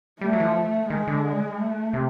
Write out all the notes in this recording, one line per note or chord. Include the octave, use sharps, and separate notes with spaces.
G3 A3
F#3
E3
F3
D#3 G#3
D3
A3
C3